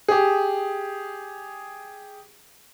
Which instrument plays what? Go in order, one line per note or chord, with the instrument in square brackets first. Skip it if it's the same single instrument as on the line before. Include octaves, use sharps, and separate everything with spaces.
[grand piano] G4 G#4